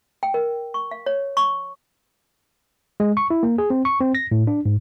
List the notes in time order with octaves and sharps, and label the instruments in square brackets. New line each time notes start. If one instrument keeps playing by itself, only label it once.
[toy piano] G5
A#4
C#6
F5
C#5
C#6
[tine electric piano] G#3
C#6
E4
A#3
G#4
C4
C#6
C4
A#6
A2
D4
G#2